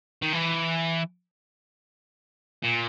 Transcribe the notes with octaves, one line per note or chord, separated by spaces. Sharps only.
D#3
E3
A#2